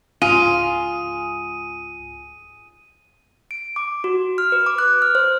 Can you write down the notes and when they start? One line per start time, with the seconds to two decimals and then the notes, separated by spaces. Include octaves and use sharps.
0.22 C#2 G#2 F4 G#4 D#7
3.51 D7
3.76 D6
4.04 F#4
4.38 F6
4.52 B4
4.66 D6
4.78 F#6
5.02 F6
5.15 C5